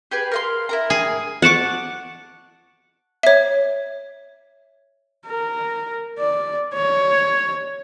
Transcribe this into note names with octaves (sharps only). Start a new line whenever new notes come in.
G4 G#4 B4
A#4 F5 C6
E4 A#4 A#5
G#4
F#5 A5 C#6 D6
C#5 E5
A#4
D5
C#5